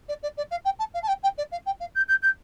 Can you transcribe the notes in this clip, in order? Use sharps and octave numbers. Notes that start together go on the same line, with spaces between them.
D5
D5
D5
F5
G5
A5
F5
A5
G5
G5
D5
F5
G5
F5
G6
G6
G6